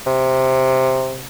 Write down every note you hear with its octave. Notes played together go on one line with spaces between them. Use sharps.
C3